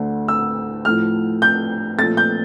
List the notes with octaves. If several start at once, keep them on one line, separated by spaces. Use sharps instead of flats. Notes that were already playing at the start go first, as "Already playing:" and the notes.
Already playing: D2 D3 A3
E6
A2 F3 A3 F6
G6
A#2 F3 A3 A6
G6